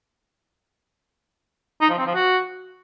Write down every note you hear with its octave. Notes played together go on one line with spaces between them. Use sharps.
D#4
F3
C4
F3
F#4